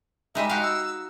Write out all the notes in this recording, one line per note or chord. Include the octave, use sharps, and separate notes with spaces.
G3 G#3 D#4 E5
F#4 F5 G5
E6